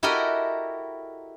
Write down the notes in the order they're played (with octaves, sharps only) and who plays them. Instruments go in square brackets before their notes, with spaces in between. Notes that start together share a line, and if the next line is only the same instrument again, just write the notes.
[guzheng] E4 F#4 G4 A4 A#4 D#5